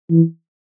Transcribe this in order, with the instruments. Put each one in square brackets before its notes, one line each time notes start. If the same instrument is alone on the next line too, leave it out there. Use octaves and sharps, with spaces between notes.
[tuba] E3